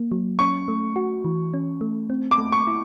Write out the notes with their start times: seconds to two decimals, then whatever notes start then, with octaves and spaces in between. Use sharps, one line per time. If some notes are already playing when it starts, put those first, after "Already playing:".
Already playing: A#3
0.12 F#3
0.39 C#4 C#6
0.68 A3
0.96 F#4
1.25 E3
1.54 C#4
1.81 A3
2.10 C4
2.31 D6
2.38 A3
2.52 C#6
2.67 E4